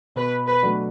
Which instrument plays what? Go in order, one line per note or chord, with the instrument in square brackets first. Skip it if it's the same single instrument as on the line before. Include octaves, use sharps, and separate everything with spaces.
[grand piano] B2 [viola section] B4
[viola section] B4
[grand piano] F#3 A3 D4 F#4